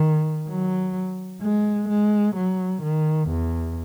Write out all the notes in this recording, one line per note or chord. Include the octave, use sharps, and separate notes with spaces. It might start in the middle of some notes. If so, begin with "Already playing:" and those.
Already playing: D#3
F#3
G#3
G#3
F#3
D#3
E2